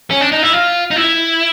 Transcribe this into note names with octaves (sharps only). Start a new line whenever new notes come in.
C#4
D4
D#4
E4
F4
D#4
E4